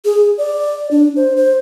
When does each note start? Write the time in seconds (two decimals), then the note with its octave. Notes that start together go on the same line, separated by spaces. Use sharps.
0.05 G#4
0.38 D5
0.91 D4
1.16 C5
1.36 C5